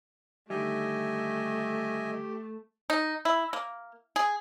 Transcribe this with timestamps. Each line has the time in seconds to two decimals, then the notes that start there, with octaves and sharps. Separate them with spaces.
0.50 D3 D#3 G3 A3 G4 D#5 E5 G#5
2.90 D#4
3.25 E4
3.53 A#3
4.16 G#4